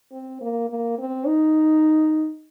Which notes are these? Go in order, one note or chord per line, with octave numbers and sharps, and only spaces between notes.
C4
A#3
A#3
C4
D#4